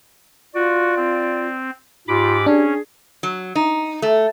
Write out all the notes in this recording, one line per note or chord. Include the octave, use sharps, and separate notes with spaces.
F4 F#4 D5
C4
G#2 F4 G4 B5 D6
C#4 D4 G#4
F#3
D#4
A3